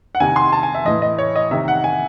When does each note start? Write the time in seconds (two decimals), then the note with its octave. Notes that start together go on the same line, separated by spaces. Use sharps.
0.15 F#5
0.20 C3 D#3 G#5
0.36 C6
0.52 A5
0.63 G#5
0.75 E5
0.85 A2 E3 D#5
1.02 D#5
1.18 C#5
1.36 D#5
1.51 C3 D#3 E5
1.68 F#5
1.84 G#5